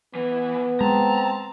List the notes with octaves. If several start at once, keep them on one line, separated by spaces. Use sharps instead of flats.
E3 B3
G#3 C4 A5 A#5